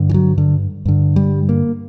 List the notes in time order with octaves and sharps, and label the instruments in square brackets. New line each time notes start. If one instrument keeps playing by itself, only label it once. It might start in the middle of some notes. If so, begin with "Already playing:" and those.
Already playing: [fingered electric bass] G2 D3
E3
F#3
D3
G2 D3
G3
A#3